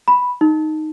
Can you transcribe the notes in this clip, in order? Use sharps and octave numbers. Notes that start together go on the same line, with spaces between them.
B5
D#4